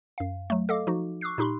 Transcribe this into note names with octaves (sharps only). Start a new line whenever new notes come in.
F#2 F5
F#3 A3
A4 D#5 F5 D6
F3 D#4 F#4
C#6 D6 E6 F#6 C7
A#2 D#4 G4 B5 C6